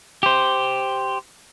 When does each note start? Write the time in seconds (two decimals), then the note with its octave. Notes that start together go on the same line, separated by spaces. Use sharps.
0.23 G4 C5